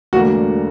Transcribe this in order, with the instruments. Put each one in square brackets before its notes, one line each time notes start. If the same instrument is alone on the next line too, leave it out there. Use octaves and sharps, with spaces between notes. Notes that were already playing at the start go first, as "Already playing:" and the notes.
[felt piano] E1 D2 D3 A#3 D4 [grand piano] F#4